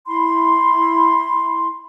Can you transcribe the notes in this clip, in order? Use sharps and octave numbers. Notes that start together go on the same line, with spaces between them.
E4 B5 C6